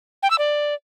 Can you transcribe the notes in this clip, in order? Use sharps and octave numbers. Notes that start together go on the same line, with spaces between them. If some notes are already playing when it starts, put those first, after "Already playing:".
G5
E6
D5